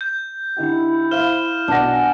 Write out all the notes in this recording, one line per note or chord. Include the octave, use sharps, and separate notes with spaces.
G6
D3 D#4 E4 G4
C5 E5 F5 F6 E7 G7
B1 B2 D4 F#5 A#6
G#5